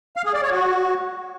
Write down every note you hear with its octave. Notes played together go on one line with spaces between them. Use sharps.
F5
G#4
D5
C#5
F#4